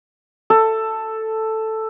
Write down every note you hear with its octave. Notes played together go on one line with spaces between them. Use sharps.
A4